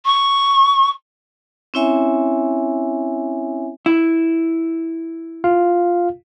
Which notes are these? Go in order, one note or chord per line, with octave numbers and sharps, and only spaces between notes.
C#6
C4 C#4 E4 C#5 E5 G#5
E4
F4 F5